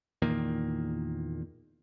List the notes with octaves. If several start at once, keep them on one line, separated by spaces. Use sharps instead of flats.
E2 A#2 D#3 A#3